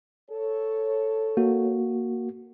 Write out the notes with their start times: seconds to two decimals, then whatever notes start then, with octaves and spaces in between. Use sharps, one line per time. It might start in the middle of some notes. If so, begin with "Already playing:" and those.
0.31 A4 C#5
1.37 A#3 F#4